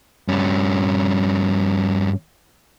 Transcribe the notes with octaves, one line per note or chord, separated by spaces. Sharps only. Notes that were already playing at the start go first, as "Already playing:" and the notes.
G2 C#4